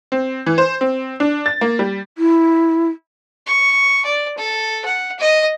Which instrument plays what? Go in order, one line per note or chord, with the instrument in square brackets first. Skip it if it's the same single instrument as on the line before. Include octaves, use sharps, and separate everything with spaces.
[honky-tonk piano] C4
E3
C5
C4
D4
A6
A#3
G3
[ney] E4
[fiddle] C#6
D5
A4
F#5
D#5